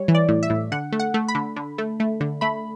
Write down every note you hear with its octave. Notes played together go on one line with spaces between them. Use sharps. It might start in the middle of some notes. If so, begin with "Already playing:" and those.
Already playing: G3 C#5
E3
D5
A2
E5
A2
D3 F#5
A3
F#5
A3
B5
D3
D3
A3
A3
D3
A3 B5